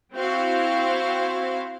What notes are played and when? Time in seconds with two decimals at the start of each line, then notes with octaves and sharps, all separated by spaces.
0.14 C4 E4 F#4 C5 F5